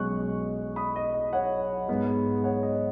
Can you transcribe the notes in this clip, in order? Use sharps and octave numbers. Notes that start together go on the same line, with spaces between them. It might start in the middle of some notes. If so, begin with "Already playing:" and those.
Already playing: B1 B2 G#3 C#4 D#5 G#5 C#6 F#6
B5 D#6
D#5
D#5
C#5 F#5
G#2 G#3 B3
C#5 F#5
D#5
D#5